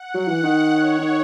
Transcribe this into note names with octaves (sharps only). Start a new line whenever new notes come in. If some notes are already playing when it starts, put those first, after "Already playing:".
Already playing: F#5
F#3
E3
D#3
C#5
D#3